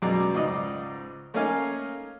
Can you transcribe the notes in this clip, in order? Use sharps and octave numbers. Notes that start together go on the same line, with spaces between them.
F#2 B2 G#3 D5 A#5
C#2 G#2 D#4 D5 D#5
A3 A#3 C#4 D#4 F5 G#5